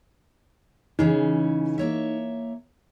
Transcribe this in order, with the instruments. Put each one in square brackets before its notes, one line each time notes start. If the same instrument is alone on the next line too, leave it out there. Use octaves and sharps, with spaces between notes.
[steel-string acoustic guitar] C#3 E3 C#4 [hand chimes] D#4
[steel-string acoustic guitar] A#3 C#5 E5